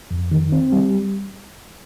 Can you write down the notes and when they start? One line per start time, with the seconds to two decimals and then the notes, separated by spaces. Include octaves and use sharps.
0.11 F2
0.31 D#3
0.52 C4
0.72 G3